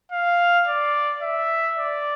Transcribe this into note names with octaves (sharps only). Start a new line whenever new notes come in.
F5
D5
E5
D5